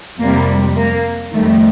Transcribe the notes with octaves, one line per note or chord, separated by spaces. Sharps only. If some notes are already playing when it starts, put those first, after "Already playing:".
F2 C3 G3 A#3
A#3
F2 D#3 G3 A3